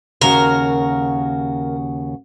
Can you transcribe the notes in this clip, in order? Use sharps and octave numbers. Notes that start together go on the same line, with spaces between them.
D#2 C#3 F#4 A#4